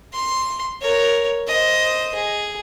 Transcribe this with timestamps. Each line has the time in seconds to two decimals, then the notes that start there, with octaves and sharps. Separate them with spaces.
0.13 C6
0.82 A#4 C#5
1.47 C5 D#5
2.14 G#4